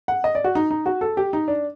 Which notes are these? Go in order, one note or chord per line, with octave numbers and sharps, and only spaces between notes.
F#5
D#5
D5
F#4
D#4
D#4
F#4
A4
G4
D#4
D4